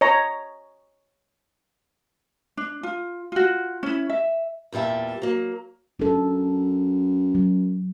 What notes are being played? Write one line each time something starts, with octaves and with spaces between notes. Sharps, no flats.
C#5 D#5 A#5
D4
F4
F4 F#4
C#4 E4
E5
E2 A#2 G3 E5 A5
F#3 A#3
F#2 D4 A4
F#3